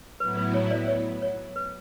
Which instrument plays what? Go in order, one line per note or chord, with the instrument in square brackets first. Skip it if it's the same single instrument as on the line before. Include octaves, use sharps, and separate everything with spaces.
[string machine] A2 F#3 B3 E4 [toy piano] B4
[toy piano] B4
C#5
D5
C#5
C#5
B4